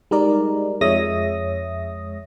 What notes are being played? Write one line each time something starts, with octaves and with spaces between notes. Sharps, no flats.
G3 G#3 D#4 A#4 D5
F2 G#3 C#5 E5 D#6 A#6